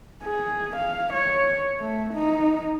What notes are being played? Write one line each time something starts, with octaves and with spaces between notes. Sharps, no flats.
G#4
F5
C#5
A3
D#4